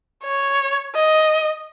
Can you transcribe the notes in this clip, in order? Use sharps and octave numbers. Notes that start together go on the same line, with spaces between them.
C#5
D#5